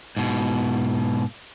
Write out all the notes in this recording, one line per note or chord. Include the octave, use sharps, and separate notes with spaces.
G#2 B2